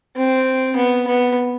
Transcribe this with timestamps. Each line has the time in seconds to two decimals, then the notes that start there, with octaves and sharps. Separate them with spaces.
0.17 C4
0.76 B3
1.07 B3